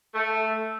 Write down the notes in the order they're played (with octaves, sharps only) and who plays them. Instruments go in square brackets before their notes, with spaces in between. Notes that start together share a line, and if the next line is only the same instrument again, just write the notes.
[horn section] A3